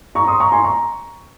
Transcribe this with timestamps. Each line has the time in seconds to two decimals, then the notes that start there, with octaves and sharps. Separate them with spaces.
0.15 A#5 C#6
0.27 C6 D#6
0.40 A#5 C#6
0.52 G#5 C6
0.64 A#5 C#6